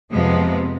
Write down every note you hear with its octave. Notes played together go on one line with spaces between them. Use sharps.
F2 C3 F3 G#3 B3